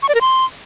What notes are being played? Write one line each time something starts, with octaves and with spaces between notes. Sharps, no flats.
C#6
D5
A#4
C6